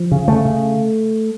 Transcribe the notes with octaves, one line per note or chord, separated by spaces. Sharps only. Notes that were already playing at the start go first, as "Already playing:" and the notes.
Already playing: F3
C#3
C#3 A3
C#3